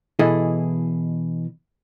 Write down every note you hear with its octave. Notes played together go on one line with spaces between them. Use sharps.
B2 E3 E4 G#4 A4 D#5